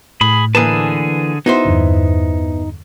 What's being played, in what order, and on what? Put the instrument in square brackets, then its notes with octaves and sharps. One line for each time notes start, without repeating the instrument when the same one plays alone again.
[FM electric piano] A2 [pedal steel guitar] G#4 B5
[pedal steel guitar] D3 G#4 A5 [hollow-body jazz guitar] E3 A#3 B4
[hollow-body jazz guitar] B3 E4 C5 [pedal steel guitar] D#4 [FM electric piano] F#4
[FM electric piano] E2 G2 D3